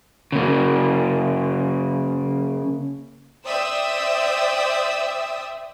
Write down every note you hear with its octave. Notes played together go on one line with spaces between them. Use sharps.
C#3 A#3
C5 D5 E5 G5 D#6 E6